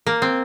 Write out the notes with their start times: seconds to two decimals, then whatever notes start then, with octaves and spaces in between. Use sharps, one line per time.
0.07 A#3
0.22 C4